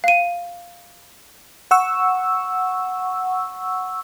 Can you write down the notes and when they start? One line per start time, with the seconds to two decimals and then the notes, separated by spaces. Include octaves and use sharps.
0.04 F5 D#7
1.71 F#5 C#6 E6